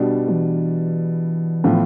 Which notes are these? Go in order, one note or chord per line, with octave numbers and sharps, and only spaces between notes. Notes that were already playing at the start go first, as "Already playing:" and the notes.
Already playing: B2 G3 D4
E3
A2 F3 B3 F4